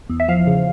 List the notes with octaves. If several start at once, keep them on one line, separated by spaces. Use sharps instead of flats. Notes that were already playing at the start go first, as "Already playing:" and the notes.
E2
E5
F3 F5
C#3